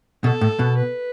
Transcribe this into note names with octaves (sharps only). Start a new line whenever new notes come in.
B2 A4
A2
B2
B4